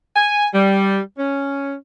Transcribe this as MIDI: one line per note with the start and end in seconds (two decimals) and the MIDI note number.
0.16 0.46 80
0.54 1.00 55
1.18 1.74 61